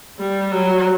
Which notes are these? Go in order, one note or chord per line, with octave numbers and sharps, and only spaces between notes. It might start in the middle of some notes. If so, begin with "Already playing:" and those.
G3
F#3